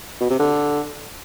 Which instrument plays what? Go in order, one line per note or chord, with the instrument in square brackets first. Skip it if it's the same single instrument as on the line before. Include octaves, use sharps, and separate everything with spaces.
[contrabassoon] B2
C3
D3